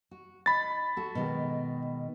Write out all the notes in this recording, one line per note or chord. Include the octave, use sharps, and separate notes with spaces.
F#4
D#4 B5 A6
F#4 A4
B2 D#3 G#3